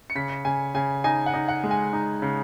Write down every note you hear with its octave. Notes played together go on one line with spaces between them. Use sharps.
C#7
C#3 B6
C#3 G#5
C#3 G#5
D#4 G#5
F#5
D#4
F#5
G#3
G#5
D#4
C#3